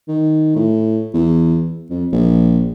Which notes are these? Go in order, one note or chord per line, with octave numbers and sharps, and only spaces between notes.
D#3
A2
E2
F2
A#1